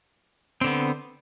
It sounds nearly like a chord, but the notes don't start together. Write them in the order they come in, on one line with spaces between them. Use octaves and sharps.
C4 D3 B3